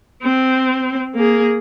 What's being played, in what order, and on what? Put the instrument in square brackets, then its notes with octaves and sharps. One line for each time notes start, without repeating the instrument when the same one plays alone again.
[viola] C4
A#3 G#4